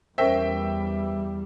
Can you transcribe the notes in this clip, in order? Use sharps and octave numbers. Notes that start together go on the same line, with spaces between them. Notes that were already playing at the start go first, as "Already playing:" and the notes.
E2 G3 C#4 A#4 C5 E5 G5